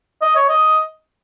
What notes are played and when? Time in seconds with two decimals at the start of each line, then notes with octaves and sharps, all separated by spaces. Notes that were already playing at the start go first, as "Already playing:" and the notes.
0.22 D#5
0.36 C#5
0.49 D#5